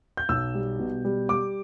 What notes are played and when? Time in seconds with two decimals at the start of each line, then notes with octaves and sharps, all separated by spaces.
0.17 G6
0.29 B1 E6
0.54 G3
0.79 B2
1.05 G3
1.29 G3 D6